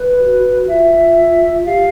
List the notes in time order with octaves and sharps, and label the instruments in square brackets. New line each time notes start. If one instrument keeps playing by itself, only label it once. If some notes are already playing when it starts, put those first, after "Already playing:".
Already playing: [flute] B4
[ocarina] F#4
F#4
[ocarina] F4 [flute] E5
[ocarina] G4 [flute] F5